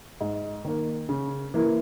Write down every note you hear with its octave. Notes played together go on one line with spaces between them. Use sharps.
G#2
D#3 A#3
C#3
E3 A#3 E4